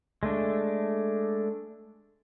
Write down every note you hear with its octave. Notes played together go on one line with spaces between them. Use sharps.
G#3 A3 D4